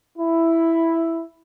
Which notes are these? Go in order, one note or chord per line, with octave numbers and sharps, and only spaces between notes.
E4